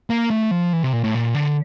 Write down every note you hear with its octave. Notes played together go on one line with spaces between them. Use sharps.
A#3
A3
F3
E3
C3
A#2
A2
A#2
D3